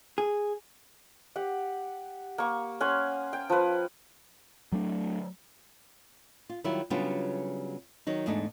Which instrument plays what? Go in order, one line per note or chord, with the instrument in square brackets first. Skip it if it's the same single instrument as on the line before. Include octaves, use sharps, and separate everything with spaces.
[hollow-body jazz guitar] G#4
[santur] G4 F#5
A#3 C#6
C#4 F#5 G#5 C6
G5
F3 B4
[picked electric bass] F#3 A3 D4
[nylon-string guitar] F4
D#3 F#3 G3 E4 F4
C#3 F#3 G3 B3 D4 F4
D#3 F#3 D#4
E2 G#2 A3 D4 D#4